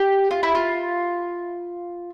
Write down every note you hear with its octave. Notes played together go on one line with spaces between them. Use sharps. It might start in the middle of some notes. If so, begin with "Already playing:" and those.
Already playing: G4
F4
E4
F4